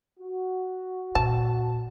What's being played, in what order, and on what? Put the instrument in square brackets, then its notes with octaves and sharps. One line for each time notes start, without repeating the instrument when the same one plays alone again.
[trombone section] F#4
[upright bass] A#2 [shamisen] A5